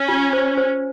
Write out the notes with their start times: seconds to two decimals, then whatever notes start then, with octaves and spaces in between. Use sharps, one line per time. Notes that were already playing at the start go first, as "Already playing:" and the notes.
Already playing: C#4
0.08 F4
0.33 C5
0.57 C5